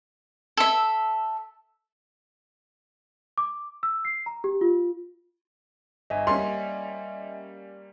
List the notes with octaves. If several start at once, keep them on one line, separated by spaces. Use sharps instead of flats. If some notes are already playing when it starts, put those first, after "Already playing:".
A4 E5
D6
E6
C7
A#5
G4
F4
G1 D#5 E5 G#5
G3 A#3 C#4 C6